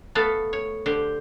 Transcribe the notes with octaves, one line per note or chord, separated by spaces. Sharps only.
A3 B3 A4 F5
C#5
D3 G4 C5